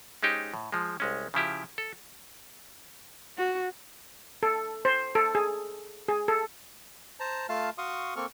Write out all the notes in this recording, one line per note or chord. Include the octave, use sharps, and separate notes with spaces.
G#3 C#4 D#4 G4 C5
A2
F3 G#3
C2 G#3 C#4
C#3 F3 E4 G4
A4
F#4
A4
C5
A4
G#4
G#4
A4
C5 A5 A#5
A3 F4 F5 A5 F6
F#4 F5 C6 C#6 D#6
A#3 C4 A4 C#6 F6